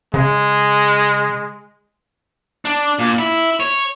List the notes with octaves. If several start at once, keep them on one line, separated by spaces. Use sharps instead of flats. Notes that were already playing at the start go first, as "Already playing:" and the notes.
C#3 G#3
D4
A#2
E4
C#5